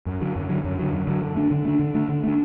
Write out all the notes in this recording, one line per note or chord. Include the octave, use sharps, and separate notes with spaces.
F#2
D3 F#3
F#2
D3 F#3
F#2
D3 F#3
F#2
D3 F#3
D3
A3 D4
D3
A3 D4
D3
A3 D4
D3
A3 D4